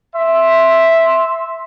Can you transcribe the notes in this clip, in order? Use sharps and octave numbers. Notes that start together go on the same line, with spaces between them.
E5 C6